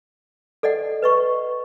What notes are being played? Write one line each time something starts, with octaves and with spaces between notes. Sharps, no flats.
A4 D5 D#5 F#5
B4 D#5 C#6